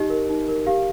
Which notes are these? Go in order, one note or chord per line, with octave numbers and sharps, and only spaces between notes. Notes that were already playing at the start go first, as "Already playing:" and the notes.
Already playing: D#4 G4 D#5
A#4
D#4
A#4
G4 F5